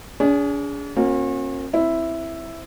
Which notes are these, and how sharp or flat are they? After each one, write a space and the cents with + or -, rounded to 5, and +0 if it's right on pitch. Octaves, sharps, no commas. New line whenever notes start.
D4 -45 G#4 -5
A#3 +0 C#4 -40 F#4 -40
C4 +0 E4 +0